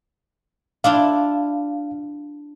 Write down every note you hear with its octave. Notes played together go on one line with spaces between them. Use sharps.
D4 E4 F4 F5